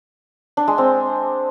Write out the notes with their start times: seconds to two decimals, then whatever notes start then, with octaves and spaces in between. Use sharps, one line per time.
0.57 D4
0.68 G#3
0.78 C4